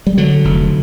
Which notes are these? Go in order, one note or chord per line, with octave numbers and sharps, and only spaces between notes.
G3
D3 F#3
F1